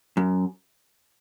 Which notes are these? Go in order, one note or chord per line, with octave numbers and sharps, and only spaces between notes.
F#2